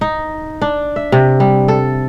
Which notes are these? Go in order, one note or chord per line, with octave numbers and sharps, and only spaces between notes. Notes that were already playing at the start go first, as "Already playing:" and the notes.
D#4
D4
E5
C3
G3
A4